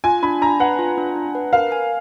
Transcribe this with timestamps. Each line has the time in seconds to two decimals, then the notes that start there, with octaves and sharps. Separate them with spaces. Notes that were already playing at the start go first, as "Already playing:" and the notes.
0.04 F4 G#5
0.23 D4 B5
0.41 D4 A#5
0.60 B4 F#5
0.79 F4
0.98 D4
1.16 D4
1.35 B4
1.53 A#4 F5
1.72 G#5